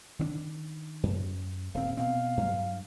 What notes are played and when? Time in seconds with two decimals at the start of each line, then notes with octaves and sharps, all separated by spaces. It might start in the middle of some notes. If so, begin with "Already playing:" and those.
0.19 D#3 C4 D4
1.03 F#2
1.74 D#1 C4 F5
1.97 B2 C4 F5
2.37 G2 F#3 G3